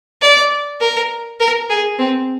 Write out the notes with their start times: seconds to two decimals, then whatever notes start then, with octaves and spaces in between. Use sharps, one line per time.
0.22 D5
0.81 A#4
1.40 A#4
1.70 G#4
1.99 C4